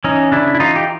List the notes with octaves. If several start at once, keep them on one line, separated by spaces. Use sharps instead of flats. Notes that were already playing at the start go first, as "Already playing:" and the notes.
E3 C#4 D#4
C#3 D4 E4
E4
E3 D#4 F4
G4